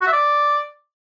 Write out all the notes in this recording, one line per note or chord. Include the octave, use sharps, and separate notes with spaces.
F#4
E5
D5